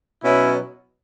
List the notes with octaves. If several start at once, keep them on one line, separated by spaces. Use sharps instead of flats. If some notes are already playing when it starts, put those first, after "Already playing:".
B2 F#3 C#4 E4